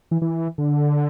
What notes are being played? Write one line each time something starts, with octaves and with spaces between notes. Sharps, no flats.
E3
E3
D3